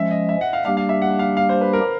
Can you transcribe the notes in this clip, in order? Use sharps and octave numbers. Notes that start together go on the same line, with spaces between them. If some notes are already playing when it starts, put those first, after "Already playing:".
Already playing: F3 G#3 C#4 E5
D#5
E5
F#5
F5
G3 A#3 D4 G4 F5
F5
E5
F#5
F5
F5
C5
B4
A#4